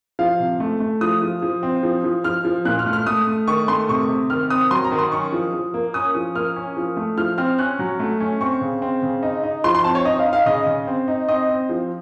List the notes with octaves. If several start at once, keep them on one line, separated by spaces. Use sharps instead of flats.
F3 F5
C3
A3
A3
F3 D#6
F3
F3
C4
F3
F3
F3 F6
F3
A#2 F#6
F6
A3
F6
A3 D#6
A3
D#3 C#6
A3 C6
C3 C#6
C3
D#3 F6
C4 D#6
F#3 C6
A#5
D#3
C6
C#4 C#6
F3
F3
A#3
C#4 D#6
F3
A#3 F6
C#4
F3
A3
F3 F6
C4 F6
C#4 F#6
F#3
A3
C#4
C4 C#6
C#3
C4
C#3
D#4
D#4
F3 C6
C6
C4 A5
C#5
D#4 D#5
F5
D#4
F5
C#3 D#5
C#3
C4
D#4
C4 D#5
C4
F3